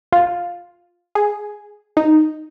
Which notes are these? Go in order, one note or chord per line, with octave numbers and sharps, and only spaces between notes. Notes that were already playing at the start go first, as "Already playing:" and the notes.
F4
G#4
D#4